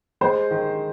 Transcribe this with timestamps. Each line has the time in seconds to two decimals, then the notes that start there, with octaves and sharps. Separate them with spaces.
0.21 G#3 C5
0.51 D#3